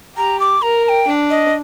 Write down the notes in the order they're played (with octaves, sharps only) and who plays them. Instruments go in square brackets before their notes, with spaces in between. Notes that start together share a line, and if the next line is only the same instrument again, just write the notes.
[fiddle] G4 [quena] A#5
[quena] D6
[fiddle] A#4 [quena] A#5
[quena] A#5
G5
[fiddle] D4
[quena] D#5